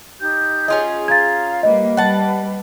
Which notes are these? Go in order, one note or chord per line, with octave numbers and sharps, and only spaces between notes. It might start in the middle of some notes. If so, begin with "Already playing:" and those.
D#4 G4 G6
C#4 F4 G#4 D#5
F5 A#5 C6 G#6 A6
G3 A#3 B4 D#5
G3 F#5 A5